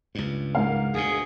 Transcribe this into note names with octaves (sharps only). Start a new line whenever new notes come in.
C#2 G2
G#2 A#4 F5
D2 B2 G#4